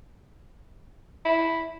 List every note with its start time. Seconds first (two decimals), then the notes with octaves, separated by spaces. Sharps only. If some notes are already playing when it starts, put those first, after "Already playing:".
1.25 E4